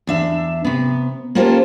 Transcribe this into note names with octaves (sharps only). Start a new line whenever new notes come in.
E2 D4 E5
C3 B3
A#3 C#4 F4 G4 A4 C5